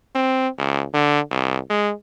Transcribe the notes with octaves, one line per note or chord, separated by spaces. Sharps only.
C4
C#2
D3
C2
G#3